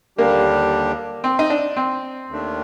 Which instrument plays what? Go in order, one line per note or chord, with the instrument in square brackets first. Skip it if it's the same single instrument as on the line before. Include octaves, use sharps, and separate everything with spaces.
[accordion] D#2 D3 G3 D4 G4 [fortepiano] A#3
[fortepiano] C4
D#4
D4
C4
[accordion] D#2 D#3 A3 D4